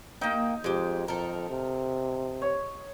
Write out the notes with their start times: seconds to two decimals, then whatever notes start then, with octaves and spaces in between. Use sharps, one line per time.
0.21 A#3 D#4 G5
0.64 F2 G#3 G4
1.08 F2 A4 A#4
1.50 C3
2.42 C#5